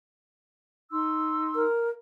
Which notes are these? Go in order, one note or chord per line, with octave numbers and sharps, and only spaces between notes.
D#4 C6 E6
A#4